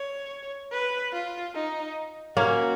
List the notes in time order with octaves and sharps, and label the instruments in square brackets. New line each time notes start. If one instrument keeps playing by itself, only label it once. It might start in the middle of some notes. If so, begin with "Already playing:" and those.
Already playing: [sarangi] C#5
B4
F4
D#4
[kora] A#3 C#4 [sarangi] F#4